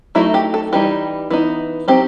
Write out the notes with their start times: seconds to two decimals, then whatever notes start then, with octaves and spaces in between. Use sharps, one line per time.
0.15 F#3 A3 D#4 E4
0.34 G4
0.54 A4
0.73 E3 G3 D#4 G4
1.30 E3 B3 D#4
1.88 F#3 C4 D#4 G4